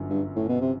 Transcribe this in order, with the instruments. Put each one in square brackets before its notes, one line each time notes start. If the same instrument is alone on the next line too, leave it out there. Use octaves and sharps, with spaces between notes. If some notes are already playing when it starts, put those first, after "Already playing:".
Already playing: [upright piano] G1 F#2 D3 F#3
[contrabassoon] G2
A2
B2
C3